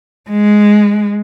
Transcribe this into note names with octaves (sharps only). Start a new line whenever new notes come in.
G#3